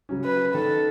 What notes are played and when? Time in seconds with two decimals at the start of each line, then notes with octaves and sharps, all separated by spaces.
0.09 C#3 F#3 C#4
0.24 B4
0.54 D#3 A4